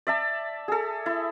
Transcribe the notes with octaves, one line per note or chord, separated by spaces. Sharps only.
D5 E5 A5
G#4 A4
E4